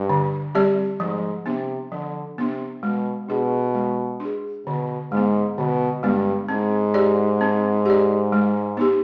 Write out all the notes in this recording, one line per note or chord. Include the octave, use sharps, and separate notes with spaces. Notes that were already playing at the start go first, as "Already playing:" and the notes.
Already playing: G2
D3
G3 C4 G4 D5
G#2 F3
C3 B3 D4
D3 F3
C3 B3 D4
B2 G#3
B2 D4 G#4
G#3
D4 G#4
B2 D3
G#2 G#3 B3
B2 D3
G2 G#3 B3
G#2 C4
G4 D5
C4
G4 D5
G#3
B3 D#4 G4